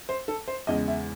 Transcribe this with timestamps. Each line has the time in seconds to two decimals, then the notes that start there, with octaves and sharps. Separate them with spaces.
0.09 C5
0.28 A4
0.48 C5
0.67 E2 C#3 G#3 D#5
0.88 E5